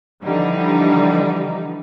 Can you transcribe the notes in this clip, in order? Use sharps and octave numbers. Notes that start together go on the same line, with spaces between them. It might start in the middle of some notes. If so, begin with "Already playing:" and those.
D3 E3 F3 G3 D#4